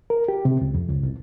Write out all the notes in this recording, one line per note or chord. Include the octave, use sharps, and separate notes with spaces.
A#4
G4
C3
C#2
F2
C#2
C2